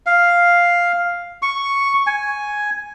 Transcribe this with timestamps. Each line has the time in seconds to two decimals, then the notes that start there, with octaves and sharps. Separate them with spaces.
0.06 F5
1.42 C#6
2.07 G#5